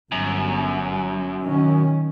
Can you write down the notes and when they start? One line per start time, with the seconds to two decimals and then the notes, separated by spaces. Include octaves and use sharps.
0.12 G1 F#2
1.43 D#3 C#4